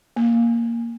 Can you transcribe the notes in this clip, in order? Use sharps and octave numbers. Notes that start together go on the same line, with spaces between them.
A#3